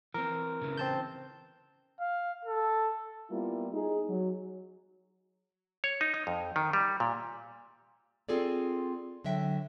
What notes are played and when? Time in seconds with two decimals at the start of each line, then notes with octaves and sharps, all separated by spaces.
0.14 E3 C4 A#4
0.61 C#3 E3
0.77 C4 A5 G6
2.00 F5
2.45 A4
3.31 G3 A#3 B3 E4 F4
3.74 D#4 G#4
4.09 F#3
5.84 C#5
6.01 D#4
6.14 D#4
6.27 F2
6.56 D#3
6.73 G3
7.00 A#2
8.29 C4 F4 G#4 A4 D5
9.24 D3 F#3 E5 G5